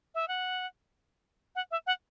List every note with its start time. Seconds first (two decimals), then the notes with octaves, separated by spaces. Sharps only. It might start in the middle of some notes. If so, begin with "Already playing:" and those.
0.15 E5
0.28 F#5
1.55 F#5
1.71 E5
1.87 F#5